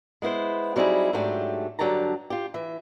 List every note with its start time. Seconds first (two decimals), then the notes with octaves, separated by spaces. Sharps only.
0.22 G#3 B3 E4 C5
0.76 F#3 G3 C4 D#4 E4 G#4
1.13 G#2 F#3 A3 D4 G4
1.79 G2 D3 F#3 G4 A5 A#5
2.30 F4 G4
2.54 E3 E5